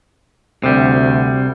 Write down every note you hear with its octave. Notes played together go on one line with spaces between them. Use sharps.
D2 C3 G3